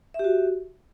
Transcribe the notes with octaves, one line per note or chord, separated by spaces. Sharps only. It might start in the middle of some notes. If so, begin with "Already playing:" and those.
F#4 G4 E5